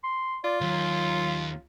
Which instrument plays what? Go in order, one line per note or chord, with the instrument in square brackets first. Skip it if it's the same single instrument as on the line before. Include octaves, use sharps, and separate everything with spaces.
[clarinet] C6
[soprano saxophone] F4 [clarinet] D5
[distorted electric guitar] D#2 [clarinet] F#3